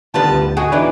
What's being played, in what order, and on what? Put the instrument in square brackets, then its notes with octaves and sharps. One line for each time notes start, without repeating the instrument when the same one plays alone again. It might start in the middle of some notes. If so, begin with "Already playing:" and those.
[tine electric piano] D3 D#3 B3 [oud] F3 G3 B4 [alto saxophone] A5
[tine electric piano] D2 [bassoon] G2
[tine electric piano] D3 [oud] F#4 [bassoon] G#4 [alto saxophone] D#5
[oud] E2 E3 [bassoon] D4 [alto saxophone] D#4 [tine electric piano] B4